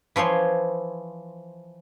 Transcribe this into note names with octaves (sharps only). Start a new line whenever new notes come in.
E3 F3 C#5 C6